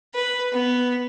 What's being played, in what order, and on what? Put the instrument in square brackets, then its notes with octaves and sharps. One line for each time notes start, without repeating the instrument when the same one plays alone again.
[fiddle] B4
B3